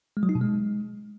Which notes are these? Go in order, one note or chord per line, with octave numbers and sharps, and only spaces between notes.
G#3
F#3
D#4
B2
G#3